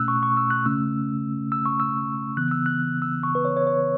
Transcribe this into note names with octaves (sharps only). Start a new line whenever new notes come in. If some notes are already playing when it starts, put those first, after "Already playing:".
Already playing: B2 A3 C#4 E6 F#6
C#6
C#6
E6
F#6
C#3 A3 C#4 E6
E6
C#6
E6
C#3 E3 B3 F#6
E6
F#6
E6
C#6
B4
C#5
C#5
C#5